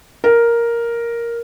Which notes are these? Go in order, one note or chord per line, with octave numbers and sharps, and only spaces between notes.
A#4